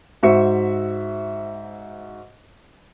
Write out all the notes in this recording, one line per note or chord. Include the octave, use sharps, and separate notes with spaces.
G#2 F#4 C5 E5 C#6 C#7